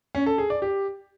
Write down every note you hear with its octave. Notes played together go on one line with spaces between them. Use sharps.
C#4
A4
G#4
D5
G4